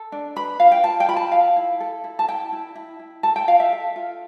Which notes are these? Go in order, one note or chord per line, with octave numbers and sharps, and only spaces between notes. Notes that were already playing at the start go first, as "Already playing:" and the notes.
Already playing: A4
D4
B4 B5
F4 F5
G5
F4 A5
G5
F4 B5
A5
A4 F5
E4
A4
E4
A5
E4 G5
E4
E4
E4
A4 A5
G5
F4 F5
E5
A4
F4